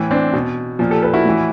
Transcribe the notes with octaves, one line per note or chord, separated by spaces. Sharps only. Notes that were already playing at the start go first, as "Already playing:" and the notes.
Already playing: A2 E3
C4 D4
B2
A#2 F3
G4 A4
A4 B4
E4 F#4
A2 E3